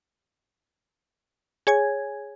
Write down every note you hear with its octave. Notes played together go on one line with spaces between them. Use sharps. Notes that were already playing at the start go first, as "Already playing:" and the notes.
G#4 C#5 G#5 G#6